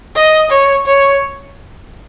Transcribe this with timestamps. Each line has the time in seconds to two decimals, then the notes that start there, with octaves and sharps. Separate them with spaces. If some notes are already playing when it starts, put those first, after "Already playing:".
0.15 D#5
0.50 C#5
0.86 C#5